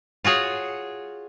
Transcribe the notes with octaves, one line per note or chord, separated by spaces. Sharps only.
F4 F#4 G#4 C#5